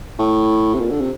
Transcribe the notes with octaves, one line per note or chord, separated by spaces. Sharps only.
A2
C3
A#2
D3
C3